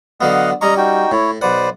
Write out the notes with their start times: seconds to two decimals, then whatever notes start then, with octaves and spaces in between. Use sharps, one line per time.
0.21 D3 F#3 B3 D#5 F5 F#5
0.61 G3 C#4 D#5 A#5 C#6
0.77 D#4 F#4 G5
1.12 A2 E4 C#5
1.42 B1 B4 C5 D5 F#5